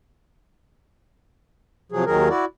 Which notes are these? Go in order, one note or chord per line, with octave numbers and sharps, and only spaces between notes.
C3 F3 F#3 G#4
D#2 D#3 F#3 G#4 A#4
E4 F#4 D5